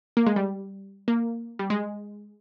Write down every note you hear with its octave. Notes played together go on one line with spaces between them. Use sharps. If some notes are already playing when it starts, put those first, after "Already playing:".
A#3
G#3
G3
A#3
G3
G#3